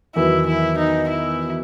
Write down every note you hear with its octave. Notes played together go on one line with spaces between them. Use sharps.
E2 D#3 F#3 B3 E4
E4
D#4
E4